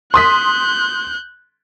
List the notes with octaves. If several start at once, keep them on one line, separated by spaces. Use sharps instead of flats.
C6 D#6 F#6 G6 B6